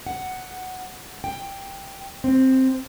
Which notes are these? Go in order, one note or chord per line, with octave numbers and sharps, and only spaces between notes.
F#5
G5
C4